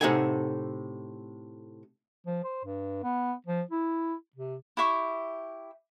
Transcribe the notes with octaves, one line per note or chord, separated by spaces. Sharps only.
A2 C3 D#4 A4 F#5 G#5
F3
C5
G2
B3
F3
E4
C3
E4 G4 E5 C#6